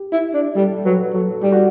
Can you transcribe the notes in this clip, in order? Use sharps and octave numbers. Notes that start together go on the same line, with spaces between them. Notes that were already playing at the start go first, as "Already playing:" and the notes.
Already playing: G4
E4
D4
G3 A4
F#3 B4
F#3 A4
G3 G4
F#4